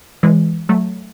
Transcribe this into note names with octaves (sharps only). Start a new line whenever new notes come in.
E3 G#3
F#3 A3